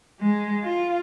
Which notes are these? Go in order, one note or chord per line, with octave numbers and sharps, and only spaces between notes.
G#3
F4